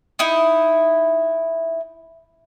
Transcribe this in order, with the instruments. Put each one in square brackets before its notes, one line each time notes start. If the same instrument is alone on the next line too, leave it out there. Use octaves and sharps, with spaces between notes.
[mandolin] D#4 E4